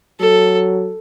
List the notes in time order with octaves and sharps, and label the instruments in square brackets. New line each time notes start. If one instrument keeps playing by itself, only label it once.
[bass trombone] F#3 [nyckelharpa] A4